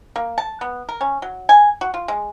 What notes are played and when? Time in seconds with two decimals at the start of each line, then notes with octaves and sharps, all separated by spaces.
0.16 A#3
0.38 A5
0.61 B3
0.89 A#4
1.01 C#4
1.22 F#3
1.49 G#5
1.81 F#4
1.94 F4
2.08 G#3